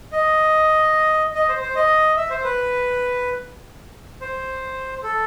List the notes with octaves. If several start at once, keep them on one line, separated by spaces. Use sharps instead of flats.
D#5
D#5
C5
C5
D#5
E5
C5
B4
C5
A4